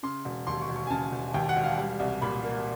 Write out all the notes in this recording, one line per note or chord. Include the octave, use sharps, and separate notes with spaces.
C#3 C6
E1
D#2 C6
C#6
E1
C#6
G#5
C#3 A5
E1
D#2 G5
F#5
E1
F5
G3
C2
A#2 B5
A#3